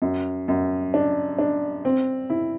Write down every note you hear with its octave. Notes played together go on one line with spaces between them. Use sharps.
F#2
F#2
D4
D4
C4
E4